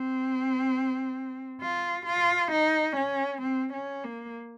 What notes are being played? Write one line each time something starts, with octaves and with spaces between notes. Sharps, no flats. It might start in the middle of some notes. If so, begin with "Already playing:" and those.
Already playing: C4
F4
F4
D#4
C#4
C4
C#4
A#3